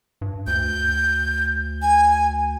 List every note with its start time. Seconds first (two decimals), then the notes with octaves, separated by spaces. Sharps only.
0.21 G2
0.47 D2 G6
1.82 G#5